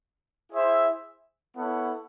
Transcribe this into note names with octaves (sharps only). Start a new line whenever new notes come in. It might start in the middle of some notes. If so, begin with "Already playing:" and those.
E4 G#4 C5 E5
B3 E4 A4 C#5 F#5